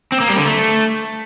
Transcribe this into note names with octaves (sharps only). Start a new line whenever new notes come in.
C4
A#3
G3
D3
A3